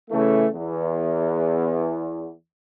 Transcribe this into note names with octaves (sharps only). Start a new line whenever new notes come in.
C#3 E3 A3
E2